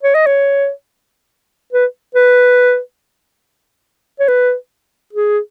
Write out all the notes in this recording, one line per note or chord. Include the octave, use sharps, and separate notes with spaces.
C#5
D#5
C#5
B4
B4
C#5
B4
G#4